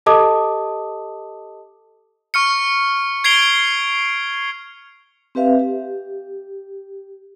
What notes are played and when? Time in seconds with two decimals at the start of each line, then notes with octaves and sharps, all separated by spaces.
0.06 G4 A4 D#5 A5 D6 D#6
2.34 C#6 F6 C#7
3.24 G#6 C7 D7 F7 G7
5.35 C4 G4 B4 E5 F5
5.59 G4